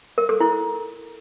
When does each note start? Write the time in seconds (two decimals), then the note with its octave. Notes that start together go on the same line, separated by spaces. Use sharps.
0.18 A#4
0.29 A4
0.40 E4